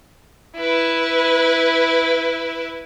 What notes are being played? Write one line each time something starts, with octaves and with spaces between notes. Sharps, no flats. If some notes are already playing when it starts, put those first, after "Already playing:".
E4 B4